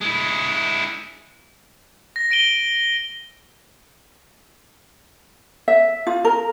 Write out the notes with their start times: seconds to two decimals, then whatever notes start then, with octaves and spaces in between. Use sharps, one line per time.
0.01 G#3 E4
2.16 A#6
2.31 A#6 D7 D#7 G7
5.68 E5
6.07 F4
6.25 A#4